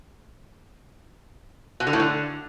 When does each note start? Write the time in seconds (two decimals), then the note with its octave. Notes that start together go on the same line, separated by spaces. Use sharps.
1.80 B2
1.87 D3
1.93 A2
2.00 D3